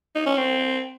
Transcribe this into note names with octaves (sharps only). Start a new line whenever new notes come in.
D#4
C#4
C4